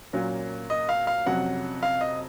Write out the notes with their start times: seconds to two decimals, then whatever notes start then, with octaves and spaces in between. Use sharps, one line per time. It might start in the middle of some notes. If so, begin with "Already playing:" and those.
0.13 A#2 F#3 C#4 F4
0.70 D#5
0.89 F5
1.07 F5
1.26 F2 C3 F#3 C#4 F#5
1.83 F5
2.01 D#5